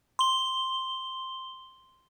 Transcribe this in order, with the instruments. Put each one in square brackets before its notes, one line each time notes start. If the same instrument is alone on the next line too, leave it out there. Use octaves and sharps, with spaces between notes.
[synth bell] C6 G7